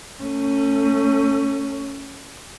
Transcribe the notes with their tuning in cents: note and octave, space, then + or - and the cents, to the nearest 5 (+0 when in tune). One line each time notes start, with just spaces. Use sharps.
A3 +30 C#4 +0